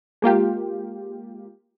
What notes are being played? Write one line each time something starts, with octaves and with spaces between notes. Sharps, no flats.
G#3 A#3 F4 G4